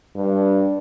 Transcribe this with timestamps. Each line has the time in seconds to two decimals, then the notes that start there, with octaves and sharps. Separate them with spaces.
0.16 G2